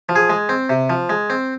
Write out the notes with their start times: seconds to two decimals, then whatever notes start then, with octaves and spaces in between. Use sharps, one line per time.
0.09 F3
0.16 G#4
0.30 G#3
0.49 C4
0.69 C3
0.90 F3
1.09 G#3
1.30 C4